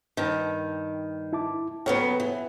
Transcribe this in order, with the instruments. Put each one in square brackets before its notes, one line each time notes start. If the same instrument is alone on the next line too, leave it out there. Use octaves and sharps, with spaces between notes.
[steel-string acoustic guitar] G2 D#3
[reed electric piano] E4 A5 D6
[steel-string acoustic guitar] C#3 F#3 B3 [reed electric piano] A4 C#5 G5
[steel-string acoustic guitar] E3